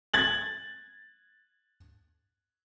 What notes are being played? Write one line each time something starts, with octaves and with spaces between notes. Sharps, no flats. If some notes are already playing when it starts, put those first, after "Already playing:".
G#6 A6 F#7